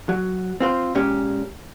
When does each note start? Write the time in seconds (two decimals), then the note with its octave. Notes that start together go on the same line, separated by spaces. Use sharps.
0.09 F#3
0.60 C4 F4 C5
0.95 A#2 G#3 C#4 G4